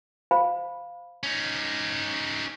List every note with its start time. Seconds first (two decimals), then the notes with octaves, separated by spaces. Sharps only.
0.31 C5 F5 B5
1.24 C#4 D#4